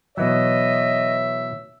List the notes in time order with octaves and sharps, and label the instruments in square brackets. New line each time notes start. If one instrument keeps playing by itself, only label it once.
[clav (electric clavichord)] B2 E3 F#3 [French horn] C#5 [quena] D#5 [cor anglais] E5